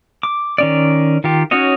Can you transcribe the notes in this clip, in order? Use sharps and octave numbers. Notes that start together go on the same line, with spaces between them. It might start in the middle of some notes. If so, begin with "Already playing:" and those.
D6
D#3 C#4 D5
D#3 F4 G4
C#4 D#4 F#4 C#5 D#5